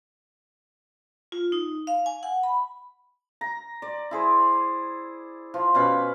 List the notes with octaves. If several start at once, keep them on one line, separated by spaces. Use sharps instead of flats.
F4
D#4
F5
G#5
F#5
B5
A#5
D5
E4 G#4 C5
F3
B2 C#4 F5 B5